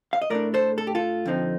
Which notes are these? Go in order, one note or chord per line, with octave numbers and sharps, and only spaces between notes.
F5
D#5
A2 A3 D4 A#4 D5
A4 C5
A4
G4
F4 A4
F2 D3 F3 C4 D#4